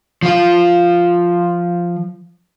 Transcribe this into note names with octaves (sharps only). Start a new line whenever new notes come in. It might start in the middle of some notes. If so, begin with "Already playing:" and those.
F3 F4